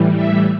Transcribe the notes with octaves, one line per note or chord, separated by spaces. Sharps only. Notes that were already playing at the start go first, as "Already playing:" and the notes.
Already playing: A2 E3 G3
E5